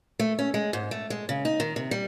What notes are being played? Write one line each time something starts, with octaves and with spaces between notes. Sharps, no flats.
A3
C#4
G#3
G#2
A3
G#3
C#3
D#4
D#3
C3
G3